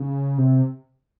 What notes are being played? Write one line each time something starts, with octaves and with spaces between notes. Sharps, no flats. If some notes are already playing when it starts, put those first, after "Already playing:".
Already playing: C#3
C3